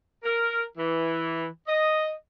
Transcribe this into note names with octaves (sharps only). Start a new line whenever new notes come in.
A#4
E3
D#5